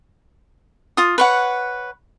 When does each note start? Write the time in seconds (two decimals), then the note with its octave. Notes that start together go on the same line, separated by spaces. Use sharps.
0.97 F4 D#6
1.18 B4 C#5 F#5